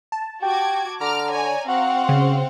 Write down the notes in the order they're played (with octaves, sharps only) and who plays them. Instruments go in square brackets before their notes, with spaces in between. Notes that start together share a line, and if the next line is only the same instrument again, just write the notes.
[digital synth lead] A5
[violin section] F#4 D6 G#6 [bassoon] G4
[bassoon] D3 [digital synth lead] A#5 [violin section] D6 F6
[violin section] C#5 D5 G#5
[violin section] C4 F5 F#5 [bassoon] F#4
[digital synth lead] C#3